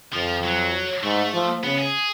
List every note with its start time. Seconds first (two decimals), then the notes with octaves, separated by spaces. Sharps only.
0.14 F2 F3
0.44 F#3
1.03 G#2 A3
1.33 F3
1.63 C#3 B3
1.78 G#4